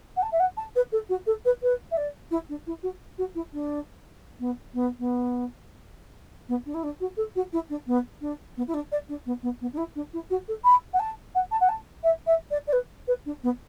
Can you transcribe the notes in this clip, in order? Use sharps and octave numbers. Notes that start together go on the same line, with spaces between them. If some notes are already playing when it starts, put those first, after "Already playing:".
F#5
A5
E5
F#5
A5
B4
A4
F#4
A4
B4
B4
E5
D5
E4
D4
E4
F#4
F#4
E4
D4
B3
B3
B3
B3
D4
E4
D4
F#4
A4
F#4
E4
D4
B3
D4
B3
E4
D4
D5
D4
B3
B3
B3
D4
E4
D4
E4
F#4
A4
B5
F#5
A5
F#5
A5
F#5
A5
E5
E5
D5
D5
B4
B4
D4
B3